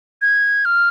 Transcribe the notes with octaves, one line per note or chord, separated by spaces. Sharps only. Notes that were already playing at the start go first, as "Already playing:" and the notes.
G#6
F6